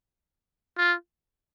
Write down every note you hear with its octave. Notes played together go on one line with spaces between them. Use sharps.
F4